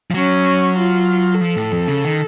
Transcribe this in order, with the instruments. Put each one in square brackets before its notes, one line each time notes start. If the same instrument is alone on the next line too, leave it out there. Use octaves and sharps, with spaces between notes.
[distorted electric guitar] F3
[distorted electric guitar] F#3 [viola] C#4
[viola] F4
[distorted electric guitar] F3 [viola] A4
[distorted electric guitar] A2
F2
C#3
D#3